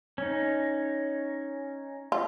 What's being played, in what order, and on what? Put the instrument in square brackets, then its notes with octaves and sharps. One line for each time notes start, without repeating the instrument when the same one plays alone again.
[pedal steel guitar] C#4 D#4
[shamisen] F4